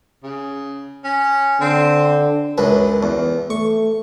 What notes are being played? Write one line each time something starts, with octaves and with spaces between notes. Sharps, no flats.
C#3
C#4
D3 C4
C#2 F#2 B4
E2
A3 C#6